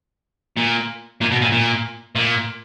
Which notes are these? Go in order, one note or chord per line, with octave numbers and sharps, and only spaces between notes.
A#2
A#2
B2
A#2
A#2
A#2